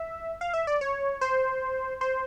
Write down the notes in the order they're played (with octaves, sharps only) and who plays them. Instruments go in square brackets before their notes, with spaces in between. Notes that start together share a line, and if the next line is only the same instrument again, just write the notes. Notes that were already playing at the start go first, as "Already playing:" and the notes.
Already playing: [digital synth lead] E5
F5
E5
D5
C#5
C5
C5